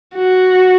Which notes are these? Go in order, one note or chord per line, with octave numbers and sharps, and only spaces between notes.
F#4